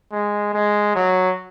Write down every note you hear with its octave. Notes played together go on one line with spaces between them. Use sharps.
G#3
G#3
F#3